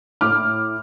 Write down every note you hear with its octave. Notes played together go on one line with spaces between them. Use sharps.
A2 D6 F6